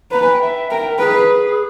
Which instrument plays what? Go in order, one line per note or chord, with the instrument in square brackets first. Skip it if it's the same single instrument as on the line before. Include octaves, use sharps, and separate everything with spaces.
[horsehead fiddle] B4 [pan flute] A#5
[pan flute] G#5
G5
E5
[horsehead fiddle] A#4 [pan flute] G5
[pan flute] G5
A#4
[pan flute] G#4 [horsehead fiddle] B4